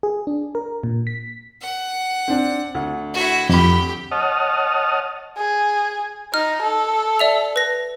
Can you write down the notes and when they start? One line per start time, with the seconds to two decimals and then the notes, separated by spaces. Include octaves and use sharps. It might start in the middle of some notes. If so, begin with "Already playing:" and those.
0.03 G#4
0.27 D4
0.55 A#4
0.84 A#2
1.07 B6
1.62 F#5
2.28 C4 D4
2.74 D2
3.14 E4 F#4
3.49 F2 G4 B5
4.11 C#5 D#5 F#5 A5 D#6 F6
5.37 G#4
6.34 D#4 F6
6.62 A4
7.19 D5 E5 F7
7.56 B4 A#6